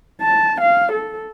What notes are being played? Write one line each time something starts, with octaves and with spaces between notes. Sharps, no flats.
A5
F5
A4